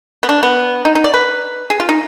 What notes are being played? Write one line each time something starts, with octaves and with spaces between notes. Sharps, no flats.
B3
D4
B3
D#4
D#4
D5
B4
G#4
F4
D#4